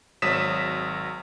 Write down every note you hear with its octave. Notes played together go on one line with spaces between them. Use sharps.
G#1 F#3 D#6 B6 E7